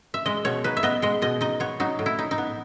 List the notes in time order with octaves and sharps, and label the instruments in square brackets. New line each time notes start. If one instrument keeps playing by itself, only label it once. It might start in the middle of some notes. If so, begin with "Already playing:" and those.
[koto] E5
G#3 D#5
B2 C#5
D#4 B4
E5
B3 D#5
G#3 D#5
B2 D#5
D#4 D#5
B3 C#5
F#3 D#4
A2
E4
D#4
D#4
B3